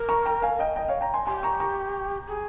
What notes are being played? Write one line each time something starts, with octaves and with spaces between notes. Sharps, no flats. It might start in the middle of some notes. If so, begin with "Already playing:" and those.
Already playing: A#4
A#5 C#6
G5 A#5
F5 G#5
D#5 G5
D#5 G5
C#5 F5
G5 A#5
G#5 C6
G4 G#5 C6
A#5 C#6
A#5 C#6
G#4